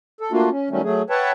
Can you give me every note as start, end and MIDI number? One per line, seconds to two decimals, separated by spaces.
0.21 0.32 69
0.32 0.49 57
0.32 0.49 58
0.32 0.49 62
0.32 0.49 65
0.32 0.49 66
0.50 0.70 61
0.70 0.81 51
0.70 0.81 54
0.70 0.81 55
0.70 0.81 57
0.70 0.81 61
0.84 1.02 54
0.84 1.02 57
0.84 1.02 68
1.10 1.32 71
1.10 1.32 73
1.10 1.32 76
1.10 1.32 78
1.10 1.32 79
1.10 1.32 81